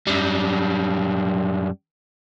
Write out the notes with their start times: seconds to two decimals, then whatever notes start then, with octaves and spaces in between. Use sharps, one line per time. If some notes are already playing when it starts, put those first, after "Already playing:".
0.07 F#2 G3